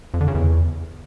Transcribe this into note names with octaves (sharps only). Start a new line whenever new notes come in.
F2
D3
C#3
E2